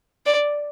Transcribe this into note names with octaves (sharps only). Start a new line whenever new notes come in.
D5